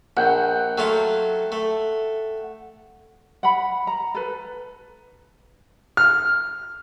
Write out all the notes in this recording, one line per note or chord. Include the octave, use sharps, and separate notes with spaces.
A#1 F#5 G5
F#3 A3 F4
A3
F#5 B5
A#5
A4 B4
F6